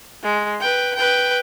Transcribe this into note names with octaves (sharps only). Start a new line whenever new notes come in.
G#3
B4 G5
B4 G5